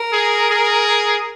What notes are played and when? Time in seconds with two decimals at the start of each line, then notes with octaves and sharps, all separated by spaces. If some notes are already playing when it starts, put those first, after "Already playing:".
Already playing: A#4
0.13 G#4
0.50 G#4